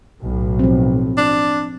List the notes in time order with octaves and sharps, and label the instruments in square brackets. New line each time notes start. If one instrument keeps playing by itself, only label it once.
[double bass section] B1 A2
[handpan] F3 C4
[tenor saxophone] D4